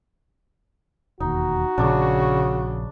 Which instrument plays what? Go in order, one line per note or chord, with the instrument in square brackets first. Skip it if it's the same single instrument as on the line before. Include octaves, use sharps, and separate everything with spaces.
[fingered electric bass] E1 D#2 [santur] D#4 [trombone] F#4
[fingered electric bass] A#1 [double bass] C#3 [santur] D4